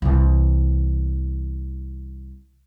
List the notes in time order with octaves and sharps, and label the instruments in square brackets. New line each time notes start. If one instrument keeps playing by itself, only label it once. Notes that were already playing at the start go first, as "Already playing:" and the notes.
[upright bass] C2 E3